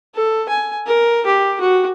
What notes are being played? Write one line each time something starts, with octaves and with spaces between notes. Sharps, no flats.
A4
G#5
A#4
G4
F#4